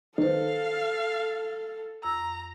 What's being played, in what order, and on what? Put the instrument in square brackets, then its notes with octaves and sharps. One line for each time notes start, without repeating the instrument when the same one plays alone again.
[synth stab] D#3 [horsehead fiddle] A4 [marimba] B4 C5 [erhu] F5
[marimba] F2 E6 [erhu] A#5